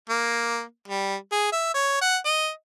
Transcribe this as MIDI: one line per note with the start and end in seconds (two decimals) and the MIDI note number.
0.10 0.62 58
0.88 1.15 55
1.32 1.52 68
1.52 1.72 76
1.74 2.01 73
2.01 2.17 78
2.25 2.49 75